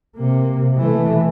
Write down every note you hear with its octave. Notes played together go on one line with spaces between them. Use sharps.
C3 A#3
E3 A3